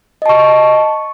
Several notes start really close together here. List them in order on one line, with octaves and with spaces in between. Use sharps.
D#5 A5 C#6